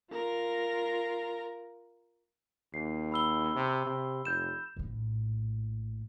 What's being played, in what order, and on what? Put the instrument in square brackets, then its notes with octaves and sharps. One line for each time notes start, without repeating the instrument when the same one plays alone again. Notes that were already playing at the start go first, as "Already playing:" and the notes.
[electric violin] F4 A#4
[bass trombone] D#2 [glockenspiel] C7
[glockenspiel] B5 E6 G7
[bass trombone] C3
C3
[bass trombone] F1 [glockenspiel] G6 E7
[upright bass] A#1 A2